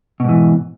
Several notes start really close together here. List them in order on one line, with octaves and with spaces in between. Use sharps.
B2 G#2 E3